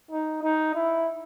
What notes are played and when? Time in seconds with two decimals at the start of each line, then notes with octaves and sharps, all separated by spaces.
0.11 D#4
0.43 D#4
0.74 E4